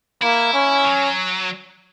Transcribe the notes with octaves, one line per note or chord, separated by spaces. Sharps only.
A#3 E4
C#4
F#3